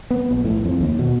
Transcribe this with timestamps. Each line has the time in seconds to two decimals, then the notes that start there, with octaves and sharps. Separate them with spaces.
0.11 B3
0.31 A#1
0.45 A2
0.65 F2
0.81 D#2
0.99 B2